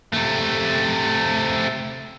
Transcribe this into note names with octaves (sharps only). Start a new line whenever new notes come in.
C3 A3